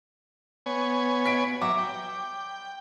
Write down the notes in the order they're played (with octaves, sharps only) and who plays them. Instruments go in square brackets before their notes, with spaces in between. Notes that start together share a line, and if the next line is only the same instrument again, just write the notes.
[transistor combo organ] B3 C#5 G#5
[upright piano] B6 D7
[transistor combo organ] F#3 E5 A#5 [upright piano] D6
[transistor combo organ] G5